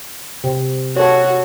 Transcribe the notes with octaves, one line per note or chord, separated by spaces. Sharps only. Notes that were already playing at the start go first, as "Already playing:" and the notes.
C3
F#4 A4 C#5